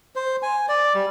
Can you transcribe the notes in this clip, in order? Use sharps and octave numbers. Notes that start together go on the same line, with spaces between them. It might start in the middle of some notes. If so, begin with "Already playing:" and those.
C5
G#5
D5
G3